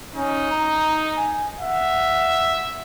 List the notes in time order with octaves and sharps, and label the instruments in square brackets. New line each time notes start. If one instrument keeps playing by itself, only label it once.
[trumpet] C#4 [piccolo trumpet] D#4
[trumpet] A#5
G#5
[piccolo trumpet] E5 [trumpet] F#5